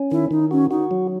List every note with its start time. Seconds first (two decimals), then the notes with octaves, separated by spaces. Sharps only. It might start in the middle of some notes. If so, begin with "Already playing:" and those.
Already playing: C#4
0.11 D#3 E4
0.31 D#3 D#4
0.51 C#4 F#4
0.71 D#4 F#4
0.91 F#3